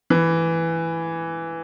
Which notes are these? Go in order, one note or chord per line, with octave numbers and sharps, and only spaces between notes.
E3